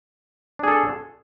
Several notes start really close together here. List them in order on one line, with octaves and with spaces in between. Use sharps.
D4 G#4 A4